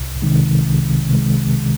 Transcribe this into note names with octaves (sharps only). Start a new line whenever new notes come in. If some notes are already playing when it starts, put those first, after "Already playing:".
Already playing: C2
C3 D#3 G#3
C2
C3 D#3 G#3